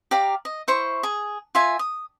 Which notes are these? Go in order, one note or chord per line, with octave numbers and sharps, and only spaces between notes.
G4 D5 F5 A#5
D#5
E4 C5 C#6
G#4
F4 E5 G#5
D#6